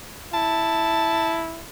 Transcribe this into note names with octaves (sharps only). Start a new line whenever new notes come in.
E4 A5